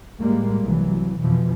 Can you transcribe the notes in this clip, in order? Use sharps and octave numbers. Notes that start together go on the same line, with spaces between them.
A2 G3 G#3 A#3
C2 E3 F#3
F2 B2 E3 F3